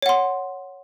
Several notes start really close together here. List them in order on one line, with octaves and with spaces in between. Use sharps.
C#5 F#5 C6